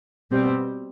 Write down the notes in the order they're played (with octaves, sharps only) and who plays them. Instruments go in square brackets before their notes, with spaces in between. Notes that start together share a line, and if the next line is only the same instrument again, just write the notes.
[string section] B2 G3 C4